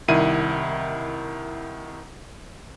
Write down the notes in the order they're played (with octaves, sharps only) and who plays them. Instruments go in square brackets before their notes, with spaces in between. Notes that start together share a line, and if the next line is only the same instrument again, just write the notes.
[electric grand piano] C2 D#3 E4 D#7